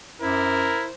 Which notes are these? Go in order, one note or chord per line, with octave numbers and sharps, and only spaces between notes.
F#2 E4 A#4 C5